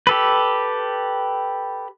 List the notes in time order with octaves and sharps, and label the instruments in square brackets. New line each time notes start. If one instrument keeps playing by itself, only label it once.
[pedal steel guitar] G4 A4 B4